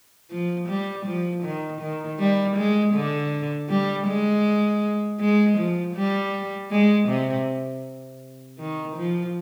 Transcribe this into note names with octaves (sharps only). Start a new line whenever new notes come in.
F3
G3
F3
D#3
D#3
G3
G#3
D3
G3
G#3
G#3
F3
G3
G#3
C3
D#3
F3